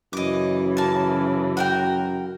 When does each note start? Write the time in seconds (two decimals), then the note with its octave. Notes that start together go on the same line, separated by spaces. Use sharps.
0.13 F#2 C#3 E3 D#5 D6
0.77 A#3 A5
1.57 F#4 A#4 G5